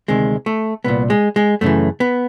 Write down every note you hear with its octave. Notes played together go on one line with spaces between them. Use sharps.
D2 C3 D#3 G#3
A3
C2 A#2 B3
G#3
G#3
F#2 C#3 E3 A3
B3